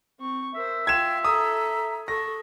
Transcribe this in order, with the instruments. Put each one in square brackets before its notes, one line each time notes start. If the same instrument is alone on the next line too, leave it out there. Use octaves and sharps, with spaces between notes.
[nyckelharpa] C4 C#6
[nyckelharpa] A#4 C5 [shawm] E5
[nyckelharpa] F4 C6 [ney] G5 [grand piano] G#6 E7
[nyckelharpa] A4 [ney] A#5 [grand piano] D#6
[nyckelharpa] A4 [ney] C#6 [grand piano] A#6